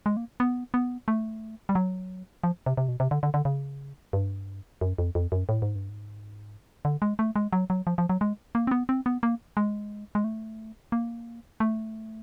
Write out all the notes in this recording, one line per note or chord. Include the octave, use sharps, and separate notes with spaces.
G#3
A#3
B3
B3
A3
G3
F#3
F3
C3
C3
B2
C3
D3
D3
D3
C#3
G2
F#2
F2
F2
F#2
A2
G#2
G2
G#2
D3
G#3
A3
G#3
F#3
F#3
F3
F3
F#3
G#3
A#3
C4
B3
C4
B3
A#3
G#3
G#3
A3
A#3
A3